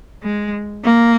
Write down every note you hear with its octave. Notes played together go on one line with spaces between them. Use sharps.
G#3
A#3